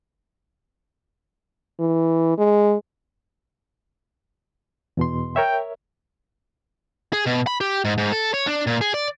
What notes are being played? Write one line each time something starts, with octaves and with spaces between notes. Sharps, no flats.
E3
G#3
E2 B2 C6
A#4 C#5 E5 G5
G#4
B2
B5
G4
G#2
G#2
A4
C#5
D4
A#2
G#4
D5